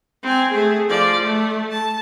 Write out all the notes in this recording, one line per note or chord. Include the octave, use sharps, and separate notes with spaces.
C4 G#5
A3 G#4
F3 D5
A3
A5